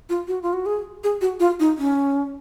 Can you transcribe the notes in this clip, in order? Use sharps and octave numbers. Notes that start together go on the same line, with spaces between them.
F4
F#4
F4
F#4
G#4
G#4
F#4
F4
D#4
C#4